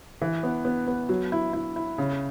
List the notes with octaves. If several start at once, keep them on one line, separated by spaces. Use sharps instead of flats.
E3
B3
B3
B3
F#3
E4
E4
E4
C#3